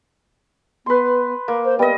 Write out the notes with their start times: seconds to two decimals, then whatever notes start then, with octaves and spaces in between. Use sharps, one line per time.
0.86 B3 B4 C6
1.48 A#3
1.65 C5
1.79 G3 B3 D#5